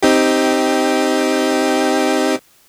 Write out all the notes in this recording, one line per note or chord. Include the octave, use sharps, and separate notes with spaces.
C4 D#4 G4